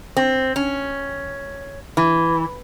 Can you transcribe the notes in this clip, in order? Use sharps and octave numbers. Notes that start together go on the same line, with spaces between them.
C4
C#4
E3